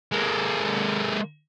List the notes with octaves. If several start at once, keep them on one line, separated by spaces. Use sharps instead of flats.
G#3 A#3